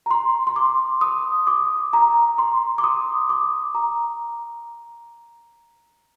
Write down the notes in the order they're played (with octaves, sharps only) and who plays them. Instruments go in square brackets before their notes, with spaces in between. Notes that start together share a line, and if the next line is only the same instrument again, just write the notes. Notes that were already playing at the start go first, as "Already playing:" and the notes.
[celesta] A#5
C6
C6
D6
D#6
D6
A#5
C6
D6
D#6
D6
A#5